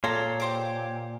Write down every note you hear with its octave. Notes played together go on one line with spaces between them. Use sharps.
A#2 A4 C#5 F5 A#5 C6
G4 C5 D6